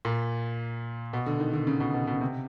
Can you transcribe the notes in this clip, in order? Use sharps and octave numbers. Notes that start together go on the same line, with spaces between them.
A#2
B2
D3
D#3
D3
C#3
B2
B2
B2
C#3
C3